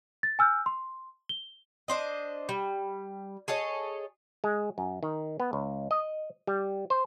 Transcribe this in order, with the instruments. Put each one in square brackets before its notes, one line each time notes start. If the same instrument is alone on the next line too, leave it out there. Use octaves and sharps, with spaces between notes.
[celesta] A6
G#5 E6 F6 G6
C6
G7
[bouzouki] D4 C5 D#5
G3
G#4 A4 C#5 D#5
[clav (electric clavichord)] G#3
F#2
D#3
B3
C#2
D#5
G3
C5